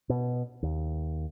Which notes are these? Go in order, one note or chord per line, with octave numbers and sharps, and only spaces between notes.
B2
D#2